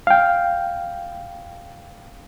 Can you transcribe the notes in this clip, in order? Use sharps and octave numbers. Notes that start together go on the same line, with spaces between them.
F5 G5